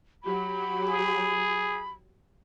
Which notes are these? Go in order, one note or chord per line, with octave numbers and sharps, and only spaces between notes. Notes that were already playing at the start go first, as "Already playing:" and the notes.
F#3 G4 B5
G#4